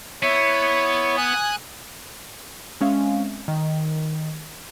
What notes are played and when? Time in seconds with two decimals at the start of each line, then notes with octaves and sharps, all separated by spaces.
0.23 B3 E4 C#5
1.18 G#5 D#6 F#6
2.81 G#3 C4 C#4 E5 F5 G#5
3.48 D#3